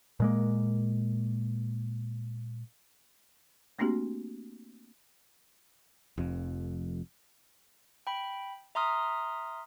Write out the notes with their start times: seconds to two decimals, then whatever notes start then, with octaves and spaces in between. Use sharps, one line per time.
0.20 A#2 G#3 A#3
3.79 A3 A#3 C4 D4 F#4 G4
6.18 F1 F2
8.07 G5 B5
8.75 E5 A#5 C6 D#6 F6